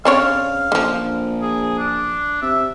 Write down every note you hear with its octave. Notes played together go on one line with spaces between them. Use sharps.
C#3 C4 D4 C#5 F5
A#1 D3 F3
G#4
D4
C3 E5